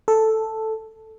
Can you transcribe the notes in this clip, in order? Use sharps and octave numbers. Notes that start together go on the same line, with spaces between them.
A4